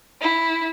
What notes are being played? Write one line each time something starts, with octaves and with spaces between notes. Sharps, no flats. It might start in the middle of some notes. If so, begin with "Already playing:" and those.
E4